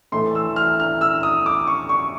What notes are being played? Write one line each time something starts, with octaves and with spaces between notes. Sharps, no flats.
A2 E3 A3 C6
E6
F6
F6
E6
D#6
D6
C#6
C#6